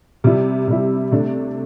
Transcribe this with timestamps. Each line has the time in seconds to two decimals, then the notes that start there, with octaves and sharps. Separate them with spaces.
0.24 C3 G3 E4
0.68 C3 G3 E4
1.12 C3 A3 D4